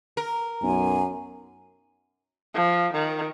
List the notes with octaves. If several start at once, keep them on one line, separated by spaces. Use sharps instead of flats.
A#4
B1 F#2 G#5
F3
D#3